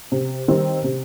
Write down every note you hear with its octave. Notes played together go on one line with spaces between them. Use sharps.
C3
D#3 G3 C4 D#4
C3